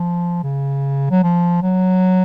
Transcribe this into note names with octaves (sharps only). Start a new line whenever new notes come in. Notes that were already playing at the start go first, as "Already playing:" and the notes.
Already playing: F3
C#3
F#3
F3
F#3